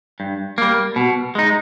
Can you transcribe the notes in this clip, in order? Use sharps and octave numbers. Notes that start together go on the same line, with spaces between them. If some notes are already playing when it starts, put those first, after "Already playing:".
G2
G3 A#3
B2
G#3 D#4